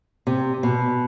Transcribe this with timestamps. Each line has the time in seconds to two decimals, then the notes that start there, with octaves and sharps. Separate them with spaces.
0.27 C3
0.63 B2